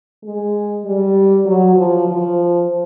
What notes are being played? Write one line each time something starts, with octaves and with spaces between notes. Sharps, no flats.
G#3
G3
F#3
F3
F3